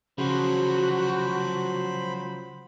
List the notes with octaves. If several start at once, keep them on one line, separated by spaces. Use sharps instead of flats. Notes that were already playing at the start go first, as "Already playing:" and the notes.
C#3 F3 F#3 F#4 C5 B5